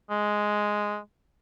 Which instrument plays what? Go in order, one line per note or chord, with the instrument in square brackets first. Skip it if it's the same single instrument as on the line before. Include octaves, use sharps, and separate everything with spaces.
[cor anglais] G#3